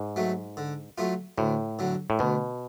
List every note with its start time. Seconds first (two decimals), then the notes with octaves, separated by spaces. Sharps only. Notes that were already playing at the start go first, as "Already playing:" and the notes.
Already playing: G#2
0.16 F#3 A3
0.57 D3
0.98 F#3 A3 F4
1.38 D2 A2
1.79 D3 F#3
2.10 A2
2.19 D2 B2